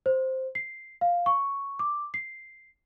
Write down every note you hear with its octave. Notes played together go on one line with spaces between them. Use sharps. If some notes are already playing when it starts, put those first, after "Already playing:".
C5
C7
F5
C#6
D6
C7